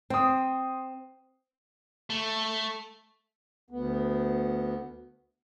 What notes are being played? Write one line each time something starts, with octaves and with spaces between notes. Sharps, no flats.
C4 C5 D#6
A3
D2 B3